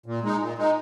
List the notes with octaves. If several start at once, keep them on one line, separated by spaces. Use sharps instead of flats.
A#2
G#3 D#4
A#2
G#3 D#4